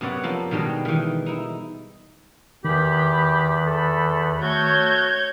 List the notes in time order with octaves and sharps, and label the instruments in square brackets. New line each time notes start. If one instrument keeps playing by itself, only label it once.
[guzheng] F#2 C3 B3 C#5 D5 F#5
F3 A#3 A4
B2 D#3 G3 G#3 D4
D#3 E3
D#4 E4
[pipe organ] E2 B5 [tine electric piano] D#3 [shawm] G4
[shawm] A4
[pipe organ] A3 [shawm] F#4 [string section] C#5 G6 G#6